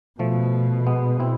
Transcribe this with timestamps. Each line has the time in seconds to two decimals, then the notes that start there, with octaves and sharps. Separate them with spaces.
0.19 B2 F3 A3
0.87 G#3 B3
1.20 C4 E4